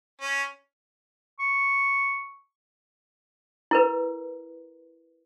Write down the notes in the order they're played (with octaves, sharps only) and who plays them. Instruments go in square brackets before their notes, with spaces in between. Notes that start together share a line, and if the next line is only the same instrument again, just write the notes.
[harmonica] C#4
[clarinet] C#6
[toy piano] E4 A#4 B4